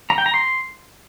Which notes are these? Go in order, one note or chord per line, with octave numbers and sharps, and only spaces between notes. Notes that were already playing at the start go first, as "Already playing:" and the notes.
A#5
G5
A#5
C6